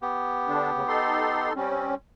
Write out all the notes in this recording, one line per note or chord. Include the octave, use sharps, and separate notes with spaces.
B3 G4
D3 D4
D2 C#3
D#4 A4 C6
G3 C4 C#4